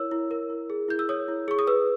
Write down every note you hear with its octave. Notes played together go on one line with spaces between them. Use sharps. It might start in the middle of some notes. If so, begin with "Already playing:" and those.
Already playing: E4 A#4 C#5 E6
E4
A#4
E4
G#4
E4 G6
E6
C#5 D#6
E4
G#4 C#6
D#6
B4 E6